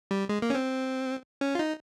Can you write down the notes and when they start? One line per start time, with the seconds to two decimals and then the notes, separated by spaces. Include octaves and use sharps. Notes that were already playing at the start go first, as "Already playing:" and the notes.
0.11 G3
0.29 G#3
0.42 A#3
0.50 C#4
0.55 C4
1.41 C#4
1.55 F4
1.59 D#4